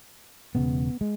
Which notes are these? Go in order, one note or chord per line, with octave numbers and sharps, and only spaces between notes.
E1 D#2 C#3 B3
G#3